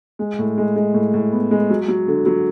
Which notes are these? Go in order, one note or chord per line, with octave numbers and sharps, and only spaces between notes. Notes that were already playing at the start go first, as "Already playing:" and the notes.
G#3
A2
G#3
G#3
A2
A2
B3
G#3
F#3
F#3
D3
F#3